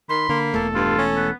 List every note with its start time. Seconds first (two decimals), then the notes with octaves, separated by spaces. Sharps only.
0.09 D#3 B5 C6
0.29 D3 A#3
0.54 E1 E2 A3 A4
0.75 G2 F4
0.98 C#4
1.16 B3